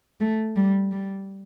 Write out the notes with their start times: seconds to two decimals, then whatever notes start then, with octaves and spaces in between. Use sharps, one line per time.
0.20 A3
0.56 G3
0.92 G3